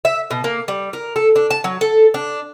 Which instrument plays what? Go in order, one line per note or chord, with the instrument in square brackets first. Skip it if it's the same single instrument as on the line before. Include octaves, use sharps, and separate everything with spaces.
[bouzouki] E5
B2
A#3
G3
A#4
A4
D4
A5
F#3
A4
D4